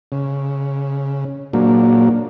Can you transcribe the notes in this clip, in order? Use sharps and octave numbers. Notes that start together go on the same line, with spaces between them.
C#3
A#2 F#3 A#3 D4